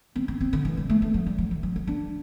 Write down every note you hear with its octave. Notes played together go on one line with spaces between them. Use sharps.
C4
C4
C4
D3
E3
G3
A3
A3
F#3
G3
F#3
E3
F#3
F#3
D4